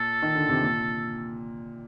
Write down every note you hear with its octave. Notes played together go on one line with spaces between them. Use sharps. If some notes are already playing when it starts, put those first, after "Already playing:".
Already playing: A#2 A4
D#3
D3
C3
A#2